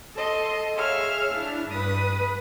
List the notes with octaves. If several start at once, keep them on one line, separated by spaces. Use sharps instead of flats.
A4 D#5 C6
G#4 C#5 E5 F5 F6
D4 E4
G2 B4 D#6